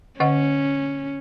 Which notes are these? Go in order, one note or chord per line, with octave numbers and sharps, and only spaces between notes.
D3 C#4 D#5 F#5